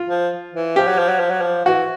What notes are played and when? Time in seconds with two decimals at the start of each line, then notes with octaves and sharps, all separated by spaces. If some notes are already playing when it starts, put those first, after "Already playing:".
Already playing: F4
0.09 F3
0.54 E3
0.76 F3 G4
0.88 F#3
0.99 F3
1.09 F#3
1.20 F3
1.31 F#3
1.41 F3
1.65 E3 F#4